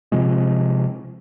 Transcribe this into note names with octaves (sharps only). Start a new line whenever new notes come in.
C3 F3 G#3